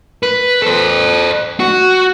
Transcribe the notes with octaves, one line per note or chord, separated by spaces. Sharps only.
B4
A4 C5
F#4